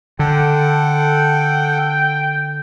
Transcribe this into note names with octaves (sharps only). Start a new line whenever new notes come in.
D3 A4 F#5 G5